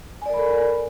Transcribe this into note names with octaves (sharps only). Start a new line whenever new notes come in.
A4 A#4 D5 G#5 B5